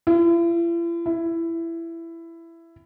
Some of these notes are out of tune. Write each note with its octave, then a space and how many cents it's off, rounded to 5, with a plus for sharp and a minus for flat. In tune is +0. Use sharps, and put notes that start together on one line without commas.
E4 +45
E4 +15